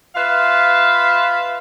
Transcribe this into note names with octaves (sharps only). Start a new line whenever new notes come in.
F4 B4 E5 F5